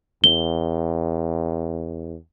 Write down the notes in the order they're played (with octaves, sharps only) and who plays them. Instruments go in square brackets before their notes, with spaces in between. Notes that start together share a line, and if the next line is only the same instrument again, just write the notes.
[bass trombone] E2 [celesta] G7